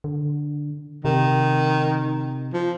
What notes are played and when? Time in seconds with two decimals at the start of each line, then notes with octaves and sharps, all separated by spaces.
0.04 D3
1.05 C3 D#3
2.54 F3